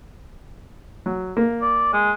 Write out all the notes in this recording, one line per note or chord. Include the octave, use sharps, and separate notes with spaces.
F#3
A#3
D5
G#3